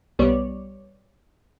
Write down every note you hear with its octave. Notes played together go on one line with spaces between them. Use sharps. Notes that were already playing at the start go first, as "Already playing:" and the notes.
B1 G3 B3 C#5 D5